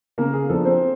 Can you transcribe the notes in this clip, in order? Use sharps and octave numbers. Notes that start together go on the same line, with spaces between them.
C#3 A#3 A#4
G#4
F3 A#3 D4 A4
C4 C5